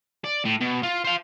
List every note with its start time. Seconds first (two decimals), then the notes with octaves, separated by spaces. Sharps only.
0.25 D5
0.45 A2
0.61 B2
0.83 F4
1.04 C5 F5